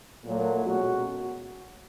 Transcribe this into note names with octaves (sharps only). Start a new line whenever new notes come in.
A#2 F#3 A3
B2 G#3 C#4 F#4